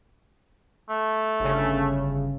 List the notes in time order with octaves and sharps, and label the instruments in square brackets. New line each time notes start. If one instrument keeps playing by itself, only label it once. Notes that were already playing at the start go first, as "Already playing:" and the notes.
[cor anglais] A3
[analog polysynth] G1 C#3